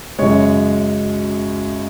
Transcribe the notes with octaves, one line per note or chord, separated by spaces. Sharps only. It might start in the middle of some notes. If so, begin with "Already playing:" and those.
F#2 C#3 G#3 C#5